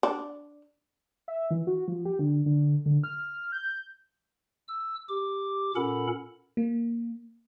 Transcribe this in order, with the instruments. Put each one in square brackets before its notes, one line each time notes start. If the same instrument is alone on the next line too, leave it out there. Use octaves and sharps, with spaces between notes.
[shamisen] D4
[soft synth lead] E5
E3
F#4
F3
G4
D3
D3
D3
F6
G6
[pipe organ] E6
G4 D6
A#2 C#4 A4 A#4 F#5 B5
[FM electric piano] A#3